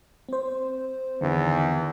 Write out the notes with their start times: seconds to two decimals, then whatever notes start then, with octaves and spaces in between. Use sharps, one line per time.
0.29 C4 C5
1.21 E2 D3 D#3